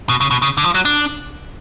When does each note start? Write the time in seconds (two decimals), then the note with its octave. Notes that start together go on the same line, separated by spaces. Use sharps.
0.09 B2
0.21 C#3
0.31 B2
0.42 C#3
0.57 D3
0.64 F3
0.75 F#3
0.85 D4